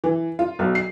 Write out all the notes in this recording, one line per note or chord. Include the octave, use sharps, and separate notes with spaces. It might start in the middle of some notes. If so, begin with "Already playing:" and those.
E3
F4
B1
C7